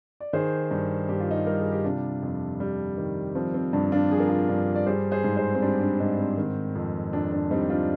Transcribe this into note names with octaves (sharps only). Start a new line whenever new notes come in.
D5
D#3 G#4 C5
G2
G2 G4
F4
D#4 G4
G3 A#4
G#4
G4
C3 D4 F4
F2
G3
D#3
F3 C4
C4
G2 D4
D4 F4
F3 G#4
A#4
F4 G#4
G2
D5
G3 G#4 C5
G#4 C5
G#2
G#4 C5
C4
G3 D4
D4
G#2 C4 D#4
C4
D#3
F2
F2 D4
D4
G3 C4 D#4
D4 F4